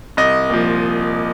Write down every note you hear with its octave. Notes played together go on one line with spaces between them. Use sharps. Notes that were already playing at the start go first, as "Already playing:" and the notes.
C2 D#5
A#2 F3